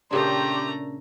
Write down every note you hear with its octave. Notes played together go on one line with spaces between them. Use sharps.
A#2 C#3 A3 D4 G4 A#5 C6